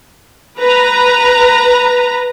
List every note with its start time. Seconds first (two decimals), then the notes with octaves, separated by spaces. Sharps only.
0.60 B4 A#5